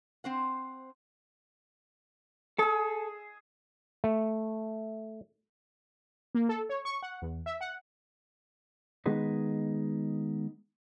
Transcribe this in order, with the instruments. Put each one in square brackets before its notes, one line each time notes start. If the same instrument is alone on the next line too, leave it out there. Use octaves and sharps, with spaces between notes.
[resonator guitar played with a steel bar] C4 C5 F#5
[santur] G#4 E6 [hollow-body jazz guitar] A4
[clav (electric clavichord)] A3
[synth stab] A#3
A4
C#5
C#6
F#5
E2
E5
F#5
[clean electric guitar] D#3 G#3 B3 D#4 G#4 B4